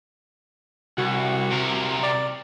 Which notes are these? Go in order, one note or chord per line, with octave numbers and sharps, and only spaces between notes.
C2 F#4
C3 A#4
D5